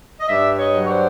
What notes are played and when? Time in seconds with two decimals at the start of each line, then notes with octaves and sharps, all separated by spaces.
0.20 D#5
0.28 G2 D5 E5
0.59 C#5 D#5
0.74 F#3
0.85 C#5
0.88 C5 D5